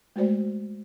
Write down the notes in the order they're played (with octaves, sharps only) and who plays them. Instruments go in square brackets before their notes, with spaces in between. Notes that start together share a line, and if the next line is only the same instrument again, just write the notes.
[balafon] G#3 A3 F#4 C5 D5